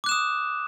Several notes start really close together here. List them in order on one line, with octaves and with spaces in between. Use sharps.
D6 F#6 E7 D#6